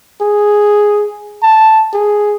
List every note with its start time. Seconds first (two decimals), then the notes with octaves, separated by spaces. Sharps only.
0.21 G#4
1.43 A5
1.93 G#4